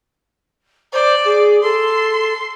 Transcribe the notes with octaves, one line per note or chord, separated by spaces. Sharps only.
C5 D5
G#4
A4 C6